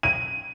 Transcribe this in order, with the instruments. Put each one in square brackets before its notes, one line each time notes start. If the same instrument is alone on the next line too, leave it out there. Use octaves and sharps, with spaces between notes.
[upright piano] D#7